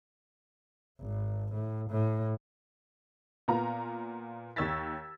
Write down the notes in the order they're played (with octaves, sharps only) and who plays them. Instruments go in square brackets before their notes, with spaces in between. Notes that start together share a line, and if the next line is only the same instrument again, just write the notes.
[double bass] G#1
A2
A2
[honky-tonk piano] A#2 B3 F4 A#5
D#2 C#5 E6 G#6 A6 B6